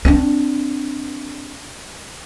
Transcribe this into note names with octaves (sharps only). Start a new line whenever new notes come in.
C4 D4